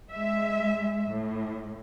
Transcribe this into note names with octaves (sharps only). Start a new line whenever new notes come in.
G#3 E5
A2